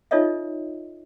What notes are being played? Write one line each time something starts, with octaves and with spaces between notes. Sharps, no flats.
D#4 F4 A4 C#5 D#5 E5